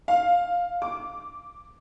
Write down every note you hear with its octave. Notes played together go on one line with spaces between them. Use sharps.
F5
D6